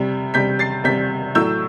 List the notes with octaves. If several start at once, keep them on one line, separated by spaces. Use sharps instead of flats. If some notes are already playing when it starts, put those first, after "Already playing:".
Already playing: C3 G3
C3 G3 G6 B6
A6 C7
C3 G3 G6 B6
A2 F#3 A3 E6 G6